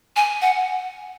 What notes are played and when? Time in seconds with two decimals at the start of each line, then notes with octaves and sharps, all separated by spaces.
0.16 G#5
0.42 F#5